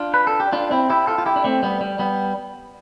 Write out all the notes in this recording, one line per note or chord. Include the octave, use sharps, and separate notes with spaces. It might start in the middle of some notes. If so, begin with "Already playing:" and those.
Already playing: D4 F4
B4
A4
G4
D4 F4
C4 E4
E4 G4
F4 A4
F4
E4 G4
D4
A3 C4
G3 B3
G3
G3 B3